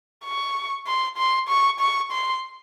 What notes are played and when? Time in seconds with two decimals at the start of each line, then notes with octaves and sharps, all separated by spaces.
0.25 C#6
0.86 C6
1.17 C6
1.49 C#6
1.80 C#6
2.11 C6